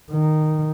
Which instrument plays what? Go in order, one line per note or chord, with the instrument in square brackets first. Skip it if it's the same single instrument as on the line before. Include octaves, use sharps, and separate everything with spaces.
[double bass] D#3